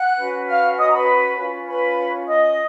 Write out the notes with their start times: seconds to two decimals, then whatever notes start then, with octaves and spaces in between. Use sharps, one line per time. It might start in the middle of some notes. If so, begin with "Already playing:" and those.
Already playing: F#5 F#6
0.17 C#4 F#4 B4
0.48 F5 F6
0.77 D#5 D#6
0.88 A#5
0.93 B4 B5
1.37 C#4 F4 B4
1.68 B4 B5
2.27 D#5 D#6